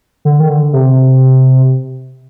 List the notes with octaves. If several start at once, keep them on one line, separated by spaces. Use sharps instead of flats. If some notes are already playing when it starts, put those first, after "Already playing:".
D3
D#3
D3
C3